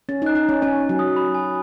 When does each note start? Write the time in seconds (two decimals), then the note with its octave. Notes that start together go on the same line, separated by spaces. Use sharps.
0.09 C#4 A6
0.22 D#4
0.26 F#6
0.35 D#4
0.44 C#4 F#6
0.62 C#4 G#5
0.81 G#5
0.89 F#3
0.99 D#6
1.16 B5
1.34 G#5